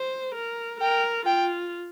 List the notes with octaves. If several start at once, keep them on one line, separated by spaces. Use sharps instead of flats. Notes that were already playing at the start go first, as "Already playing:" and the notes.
Already playing: C5
A#4
A#4 G5
F4 G5